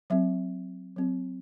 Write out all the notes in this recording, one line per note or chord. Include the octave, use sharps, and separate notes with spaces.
F#3 C4 E5
F#3 C4